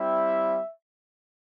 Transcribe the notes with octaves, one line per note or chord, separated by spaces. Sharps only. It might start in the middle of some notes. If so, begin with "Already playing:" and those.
Already playing: G3 C4 E4 E5